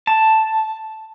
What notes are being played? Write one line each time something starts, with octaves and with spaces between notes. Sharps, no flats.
A5